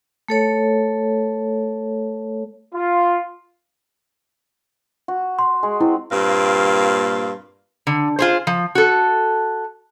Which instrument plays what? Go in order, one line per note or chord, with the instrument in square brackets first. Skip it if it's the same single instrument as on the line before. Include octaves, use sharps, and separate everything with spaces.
[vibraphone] A3 A4 C#5
[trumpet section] F4
[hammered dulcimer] F#4
[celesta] C6
[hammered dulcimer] G#3
[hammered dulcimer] C4 [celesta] E4
[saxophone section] G2 A#2 A#3 C4 F5
[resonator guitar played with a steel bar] D3
F4 G#4 C5
F3
F#4 A4